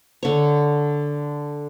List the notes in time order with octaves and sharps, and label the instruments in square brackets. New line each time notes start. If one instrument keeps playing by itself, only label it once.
[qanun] D3 C#5